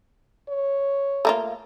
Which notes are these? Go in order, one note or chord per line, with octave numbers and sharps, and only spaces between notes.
C#5
A3 A#3 F4